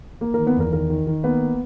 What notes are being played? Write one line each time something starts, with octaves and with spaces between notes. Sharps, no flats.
A#3 A#4
A#4
D#3
B3 B4
E2 A#4
D#3 A#4
D#3
D#3
A#3 B3 B4